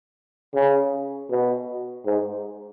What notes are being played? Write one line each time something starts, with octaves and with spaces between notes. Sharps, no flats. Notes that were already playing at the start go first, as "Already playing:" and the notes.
C#3
B2
G#2